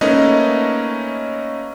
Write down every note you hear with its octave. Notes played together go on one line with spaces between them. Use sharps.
A3 A#3 C#4 D#4 B4 D#5